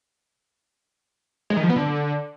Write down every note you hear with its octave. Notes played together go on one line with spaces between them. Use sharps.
G#3
D#3
F3
B3
D3